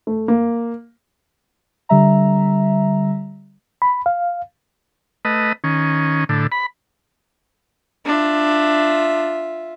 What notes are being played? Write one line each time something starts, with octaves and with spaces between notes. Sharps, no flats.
A3
A#3
D3 G3 E5 A#5
B5
F5
A3 B4 D#5
D#3 C#4
A2 D3
B5
D4 F4 E5